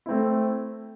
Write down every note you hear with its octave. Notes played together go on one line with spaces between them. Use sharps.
A3 C4 E4